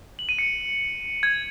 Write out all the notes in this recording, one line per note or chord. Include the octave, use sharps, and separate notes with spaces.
F#7
D#7
C#7
G#6